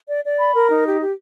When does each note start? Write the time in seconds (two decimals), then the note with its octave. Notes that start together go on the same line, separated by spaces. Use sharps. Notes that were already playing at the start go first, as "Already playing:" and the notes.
0.09 D5
0.24 D5
0.39 B5
0.55 A#4
0.70 D#4
0.85 G4
1.00 G4